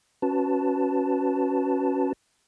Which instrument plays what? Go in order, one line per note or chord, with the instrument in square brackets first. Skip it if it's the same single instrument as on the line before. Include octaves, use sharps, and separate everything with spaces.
[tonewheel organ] C#4 F#4 B4 A5